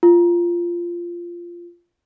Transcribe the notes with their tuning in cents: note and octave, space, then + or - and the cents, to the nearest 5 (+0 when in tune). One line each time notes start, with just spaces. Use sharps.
F4 -10